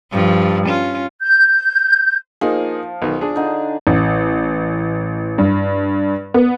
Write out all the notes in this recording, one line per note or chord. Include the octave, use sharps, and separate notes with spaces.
G2 F3
C#4 F4
G6
F3 A#3 D#4 G#4
B1 D#3
D4 G#4
D3 D#4
A1
G2
B3